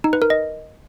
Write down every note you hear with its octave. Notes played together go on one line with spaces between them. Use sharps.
D#4
B4
A#4
D#5